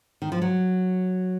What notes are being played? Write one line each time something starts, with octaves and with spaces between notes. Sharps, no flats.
D#3
F3
F#3